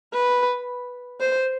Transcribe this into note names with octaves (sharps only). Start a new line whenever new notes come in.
B4
C5